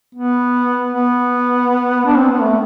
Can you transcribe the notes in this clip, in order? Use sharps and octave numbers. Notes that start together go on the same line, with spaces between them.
B3
B3
D4
C4
B3
A3